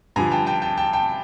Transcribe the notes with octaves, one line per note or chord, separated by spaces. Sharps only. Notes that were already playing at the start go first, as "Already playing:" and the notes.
G2 D3 F3 G#5 A#5
G5 A5
G5 A5
G5 A5
G5 A5
G5 A5